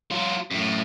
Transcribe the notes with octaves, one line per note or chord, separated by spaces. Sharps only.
F#3 F4
F#2 A2